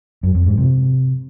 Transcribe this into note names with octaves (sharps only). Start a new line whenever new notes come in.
F#2
F2
G#2
C3